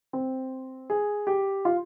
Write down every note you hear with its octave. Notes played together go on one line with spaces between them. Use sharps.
C4
G#4
G4
F4